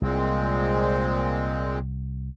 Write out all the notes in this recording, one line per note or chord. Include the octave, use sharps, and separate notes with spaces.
C2 A#2 G#3 C4